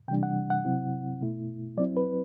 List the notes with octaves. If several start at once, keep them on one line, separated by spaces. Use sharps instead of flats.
C3 E3 G3 D4 G5
F#5
F#5
C3 F#3 C4 E4
B2 A3 E4
F#3 C4 E4 D5
B4